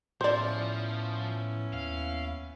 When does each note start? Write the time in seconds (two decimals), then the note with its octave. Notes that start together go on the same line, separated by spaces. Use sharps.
0.21 A2 F3 B3 C#4 E4 C5 D5
1.73 D#2 F5